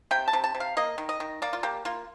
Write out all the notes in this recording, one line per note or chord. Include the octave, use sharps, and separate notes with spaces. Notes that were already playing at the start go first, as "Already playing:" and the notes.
C3 G5
A5
C3
A5
C3
F5
A#3 D#5
D#3
D#5
D#3
A#3 D5
F4
A#3 G4
A#3 F4